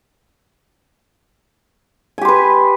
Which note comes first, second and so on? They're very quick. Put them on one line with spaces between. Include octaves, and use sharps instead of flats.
G#5 G4 C6 B4